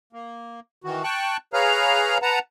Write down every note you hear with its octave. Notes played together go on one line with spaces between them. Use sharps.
A#3
D#3 E3 F#4
G5 A5 C#6 F#6
G#4 B4 C#5 F5 A#5 F6
B4 F#5 A5 A#5